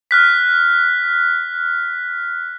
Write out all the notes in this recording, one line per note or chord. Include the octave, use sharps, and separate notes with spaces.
F6 F#6 B6